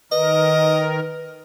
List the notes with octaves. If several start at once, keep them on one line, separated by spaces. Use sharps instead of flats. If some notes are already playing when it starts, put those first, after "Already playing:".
D#3 A#4 B4 D#5